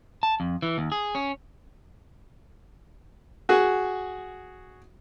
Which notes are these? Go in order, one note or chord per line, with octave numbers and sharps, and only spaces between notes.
A5
F2
E3
D#2
G#4
C#4
F#4 G#4